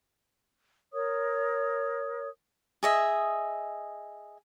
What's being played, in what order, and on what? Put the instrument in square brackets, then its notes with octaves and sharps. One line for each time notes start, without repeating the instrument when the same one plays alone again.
[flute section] A#4 C#5 D#6
[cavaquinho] G#4 D#5 E5